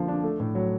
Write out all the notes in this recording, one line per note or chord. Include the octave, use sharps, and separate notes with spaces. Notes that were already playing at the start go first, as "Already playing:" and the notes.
Already playing: D3 F3 A#3
D4
A3
A2
F#3